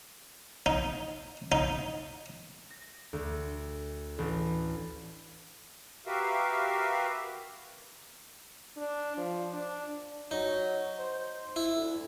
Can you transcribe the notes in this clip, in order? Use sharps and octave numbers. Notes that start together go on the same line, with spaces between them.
D#4
D#4
A#6
D2
A1
F#4 G4 A#4 B4 E5 F5
D4
F3
D4
F#3 D#4
C5
E4
D2